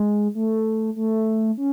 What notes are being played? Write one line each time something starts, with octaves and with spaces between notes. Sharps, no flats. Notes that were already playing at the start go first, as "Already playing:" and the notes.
Already playing: G#3
A3
A3
C#4